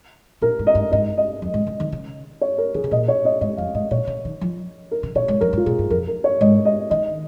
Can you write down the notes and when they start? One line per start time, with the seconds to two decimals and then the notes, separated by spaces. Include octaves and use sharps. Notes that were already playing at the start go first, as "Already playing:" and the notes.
0.42 A#2 A#4
0.59 G#2
0.67 D#5
0.75 G#2
0.92 G#2 D#5
1.18 D#5
1.42 F2
1.54 G#2
1.67 C#3
1.80 D#3
1.92 C#3
2.41 C#5
2.58 A#4
2.74 D#3 G#4
2.84 C#3
2.91 A#2 D#5
3.08 C#5
3.25 D#5
3.41 G#2 D#5
3.57 F2 F5
3.75 G#2 D#5
3.91 A#2 C#5
4.07 C#3
4.25 D#3
4.41 F3
4.91 A#4
5.03 C#3
5.15 A#2 C#5
5.28 G#2
5.41 F2 A#4
5.53 G#2
5.57 F4
5.66 A#2 G#4
5.79 G#2
5.90 F2 A#4
6.08 A#4
6.24 C#5
6.41 G#2 D#5
6.65 D#5
6.90 D#3 D#5